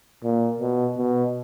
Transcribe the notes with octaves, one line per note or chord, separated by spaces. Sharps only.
A#2
B2
B2